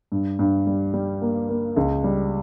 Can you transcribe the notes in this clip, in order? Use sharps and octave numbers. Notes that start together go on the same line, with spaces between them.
G2
G2
G3
G3
A#3
A#3
C#2
G3